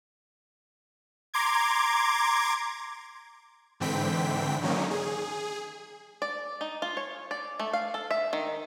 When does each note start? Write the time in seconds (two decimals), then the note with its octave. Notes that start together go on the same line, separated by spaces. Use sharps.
1.34 A#5 C6 D6 G#6
3.80 G#2 D3 E3 C4 G5 B6
4.62 D3 D#3 F#3 A#3 C#4 D#4
4.91 G#4
6.22 D5
6.61 D#4
6.82 F4
6.97 C#5
7.31 D5
7.60 A3
7.73 F5
7.94 A4
8.11 E5
8.33 D#3